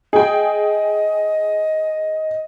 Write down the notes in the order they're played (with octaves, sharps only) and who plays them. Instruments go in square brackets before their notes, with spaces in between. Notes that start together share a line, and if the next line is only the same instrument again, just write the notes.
[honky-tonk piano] G#4 G5 [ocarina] D#5